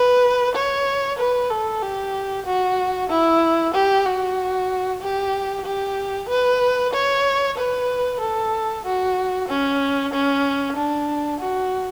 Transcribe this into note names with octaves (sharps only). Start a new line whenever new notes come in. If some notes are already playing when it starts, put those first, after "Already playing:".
Already playing: B4
C#5
B4
A4
G4
F#4
E4
G4
F#4
G4
G4
B4
C#5
B4
A4
F#4
C#4
C#4
D4
F#4